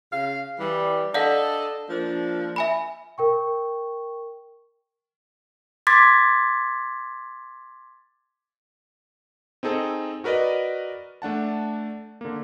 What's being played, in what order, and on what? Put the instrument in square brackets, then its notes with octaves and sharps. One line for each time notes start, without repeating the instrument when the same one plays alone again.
[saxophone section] C#3 F5
E3 G3
[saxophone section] D4 A4 D#5 [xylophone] D5 F5 F#5
[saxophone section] F3 A#3 D4
[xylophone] E5 G#5 B5
[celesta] A#4 G5 C#6
[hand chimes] C6 D6 G#6 A6 B6
[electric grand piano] C4 D#4 G#4 A4 D#5
F#4 A#4 B4 D5 D#5
A3 D4 F#5 A5
D3 A#3